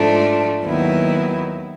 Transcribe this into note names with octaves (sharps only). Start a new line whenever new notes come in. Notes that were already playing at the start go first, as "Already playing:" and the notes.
Already playing: G#2 F3 A3 D4
D#2 D#3 F#3 B3 E4